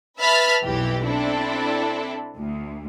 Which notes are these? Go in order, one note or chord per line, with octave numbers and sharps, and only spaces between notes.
B4 E5 A5 B5 F6 A6
B1 F2 E3 G4
C4 D4 E4 A4
D2